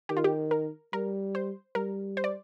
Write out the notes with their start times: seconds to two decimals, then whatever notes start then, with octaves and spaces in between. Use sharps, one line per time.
0.09 D#3 G4
0.17 F4
0.24 G4
0.51 A#4
0.93 G3 A#4
1.35 C5
1.75 G3 A#4
2.17 C5
2.24 D5